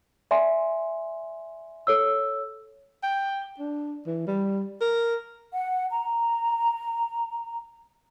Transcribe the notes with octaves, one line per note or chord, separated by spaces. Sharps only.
D5 E5 G#5 C6
A4 C#5 E6
G5
D4
E3
G3
A#4
F#5
A#5